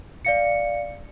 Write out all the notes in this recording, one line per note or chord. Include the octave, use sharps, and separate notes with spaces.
D5 F5 C#7